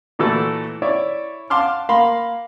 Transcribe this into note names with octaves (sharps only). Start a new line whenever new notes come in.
A#2 E3 A3 E4 F#4 A4
E4 C#5 D5 E5 C#6
F5 F#5 A5 C6 D6 F6
A#3 F5 B5 C6